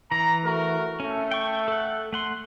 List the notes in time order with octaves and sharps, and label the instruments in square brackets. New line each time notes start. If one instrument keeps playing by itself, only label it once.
[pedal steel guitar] E3 [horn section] A#5
[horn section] A3 F#4 A#4
[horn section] A3 [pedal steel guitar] C#4
[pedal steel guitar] G5 C#6
A4 F#5
A3 F#5 C6